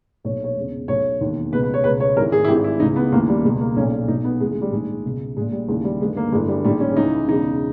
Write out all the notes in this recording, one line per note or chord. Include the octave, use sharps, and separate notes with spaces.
B1 A#2 C#5
C#5
E1 E2 C#3
B1 B2 C#5
E1 D#2 D#3
C#2 B2 B4
B4
C#5
C#2 B2 B4
C#5
G#1 G#2 E3 A#4
G#4
E4
G#1 G#2 E3 G4
E4
C#2 C#3 E3 D#4
B3
D#2 C#3 E3 A#3
G3
C#2 B2 G#3
A#3
B1 A#2 C#4
B1 B2 D#4
B3
D#2 C#3 E3 G#3
G#3
G3
A#1 G#2 D#3 G#3
C#2 B2
A#1 A#2 G#3
G3
D#2 C#3 E3 G#3
G3
G1 G2 D#3 G#3
A#3
G1 G2 E3 G#3
G3
A#1 G#2 D#3 G3
C#4
C#2 C#3 E3 D#4
E1 E2 C#3 D#4